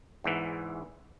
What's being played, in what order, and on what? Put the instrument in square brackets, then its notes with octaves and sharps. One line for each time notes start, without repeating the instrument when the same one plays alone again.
[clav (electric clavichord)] E2 G#2 E3